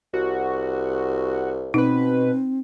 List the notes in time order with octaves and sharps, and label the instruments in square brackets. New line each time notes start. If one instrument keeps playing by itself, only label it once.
[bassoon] C2 [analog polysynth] F#4
[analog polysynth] B2 B4 [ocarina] C4 [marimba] D#4